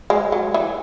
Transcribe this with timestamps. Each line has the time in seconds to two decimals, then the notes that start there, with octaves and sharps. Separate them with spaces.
0.10 G#3
0.32 F#3
0.54 E3